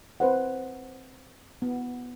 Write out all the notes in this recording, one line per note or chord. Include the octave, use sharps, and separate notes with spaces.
C4 B4 C5 F#5
B3